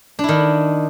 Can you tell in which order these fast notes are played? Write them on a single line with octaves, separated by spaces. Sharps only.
D4 E4 D#3